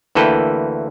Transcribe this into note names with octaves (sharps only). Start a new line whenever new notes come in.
D2 E3 A#3 A4 B4 G5